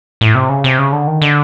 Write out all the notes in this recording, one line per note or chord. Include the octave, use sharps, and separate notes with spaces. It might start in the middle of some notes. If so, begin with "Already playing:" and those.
A2
C3
C#3
C3
C#3
D3
D#3
D3